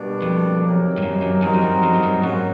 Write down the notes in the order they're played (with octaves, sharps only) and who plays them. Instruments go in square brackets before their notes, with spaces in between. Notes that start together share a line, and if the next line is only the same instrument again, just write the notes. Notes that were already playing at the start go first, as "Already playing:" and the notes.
Already playing: [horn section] B2 G3 A#3 D4
[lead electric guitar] F2
[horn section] C3 D#3 F#3 A#3 D#4
[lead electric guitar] G2
F#2
F#2
[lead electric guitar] F#2 [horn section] G3 C4 D#4 F#4 A#4
[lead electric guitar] F2
F#2
F2
G2
F#2
[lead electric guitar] G#2 [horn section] F#3 A#3 C#4 F#4